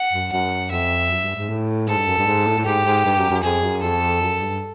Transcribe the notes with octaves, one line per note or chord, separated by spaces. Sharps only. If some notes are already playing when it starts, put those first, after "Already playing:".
Already playing: F#5
F#2
F#2 F#5
F2 E5
F#2
G2
G#2
A2
G#2 A4
G2
F#2
G2
G#2
A2
A2
G#2 G4
G#2
G2
F#2
F#2
F2 G#4
F#2
F2 A4
F#2
G2